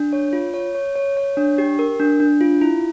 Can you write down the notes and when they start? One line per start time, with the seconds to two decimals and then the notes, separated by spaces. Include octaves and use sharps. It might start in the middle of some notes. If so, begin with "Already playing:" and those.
Already playing: D4
0.13 C#5
0.33 F4
0.54 C#5
0.75 C#5
0.96 C#5
1.17 C#5
1.37 D4
1.58 G4
1.79 A#4
1.99 D4
2.20 D4
2.41 F4
2.61 E4